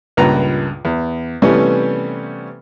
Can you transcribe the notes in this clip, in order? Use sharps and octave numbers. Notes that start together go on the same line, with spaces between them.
C#2 G2 A#2 B4 A#5
E2
C3 E3 G3 A3 B3 C#4